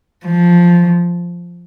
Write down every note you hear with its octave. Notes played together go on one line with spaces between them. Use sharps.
F3